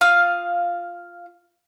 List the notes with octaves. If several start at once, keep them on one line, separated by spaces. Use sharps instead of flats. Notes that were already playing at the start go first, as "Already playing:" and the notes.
F4 F5 D#6